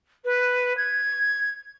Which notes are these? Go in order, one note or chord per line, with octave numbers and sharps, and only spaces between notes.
B4
G#6